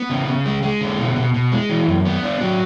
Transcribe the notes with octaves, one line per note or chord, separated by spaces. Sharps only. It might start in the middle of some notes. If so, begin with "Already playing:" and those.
Already playing: B3
C#3
C#3
G#3
G#3
D3
B2
B2
B2
G#3
E3
F#2
B3
D4
F#3